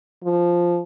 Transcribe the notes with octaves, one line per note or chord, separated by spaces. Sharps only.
F3